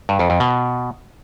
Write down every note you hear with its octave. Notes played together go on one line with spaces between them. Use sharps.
G2
F2
F2
B2